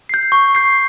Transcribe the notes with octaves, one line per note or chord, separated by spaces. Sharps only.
G6 C7
C#6
G6 C7